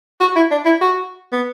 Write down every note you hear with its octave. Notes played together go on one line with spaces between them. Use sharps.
F#4
E4
D4
E4
F#4
B3